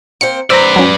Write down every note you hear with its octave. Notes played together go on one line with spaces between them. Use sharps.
A#3 C4 C5 C#7
B4 C5 D5 A#5 E6
F#3 C#4